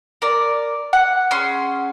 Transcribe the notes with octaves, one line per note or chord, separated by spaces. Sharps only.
A#4 D5
F#5 F#6
C#4 G#4 C6